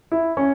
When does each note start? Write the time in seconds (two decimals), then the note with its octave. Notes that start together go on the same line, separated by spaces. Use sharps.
0.12 E4
0.37 C#4